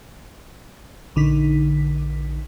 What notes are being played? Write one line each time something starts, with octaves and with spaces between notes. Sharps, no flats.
A#1 D3 D#4 B6